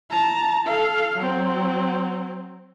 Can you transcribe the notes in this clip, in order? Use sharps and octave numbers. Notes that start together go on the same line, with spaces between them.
A5 A#5
A4 F5
F#3 C4